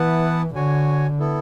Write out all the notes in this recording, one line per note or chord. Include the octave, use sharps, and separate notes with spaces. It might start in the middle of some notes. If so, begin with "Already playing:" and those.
Already playing: E3 B3 E4 B4 F#5 A5
D3 F#4 C#5 G#5
B3 E4 A4